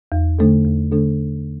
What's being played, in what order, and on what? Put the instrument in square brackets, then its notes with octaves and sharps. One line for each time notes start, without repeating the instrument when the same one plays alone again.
[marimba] E2
D3 A3 D4 A4
E2
D3 A3 D4 A4